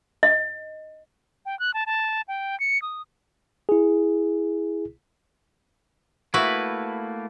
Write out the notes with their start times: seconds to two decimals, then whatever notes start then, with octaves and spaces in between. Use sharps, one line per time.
0.23 D#5
1.46 G5
1.59 F#6
1.74 A5
1.86 A5
2.28 G5
2.60 C#7
2.82 D#6
3.69 E4 G#4
6.34 A3 A#3 E4 F#4 B4